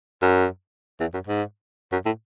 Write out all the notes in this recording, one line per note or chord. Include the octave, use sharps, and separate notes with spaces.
F#2
E2
F#2
G#2
F#2
A2